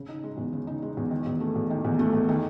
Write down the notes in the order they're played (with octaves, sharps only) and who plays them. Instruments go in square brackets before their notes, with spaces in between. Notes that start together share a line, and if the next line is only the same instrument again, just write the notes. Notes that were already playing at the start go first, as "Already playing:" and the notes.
Already playing: [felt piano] C#3
D#4
G#3
E2
C#3
D#4
G#3
E2
D#3
E2
A3
E2
D#3
E2
A3
E2
D#3